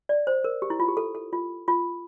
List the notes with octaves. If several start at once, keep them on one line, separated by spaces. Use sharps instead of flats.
D5
C5
A#4
G4
E4
F4
G4
A4
A4
F4
F4